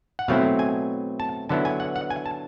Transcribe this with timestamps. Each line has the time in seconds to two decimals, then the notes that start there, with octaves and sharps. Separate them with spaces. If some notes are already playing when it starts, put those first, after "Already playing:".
0.19 F#5
0.28 B2 F#3 A3 C4 E4 F5
0.59 G#5
1.20 A5
1.49 D3 F#3 B3 E4 A5
1.65 G#5
1.80 F#5
1.96 F#5
2.10 G#5
2.26 A5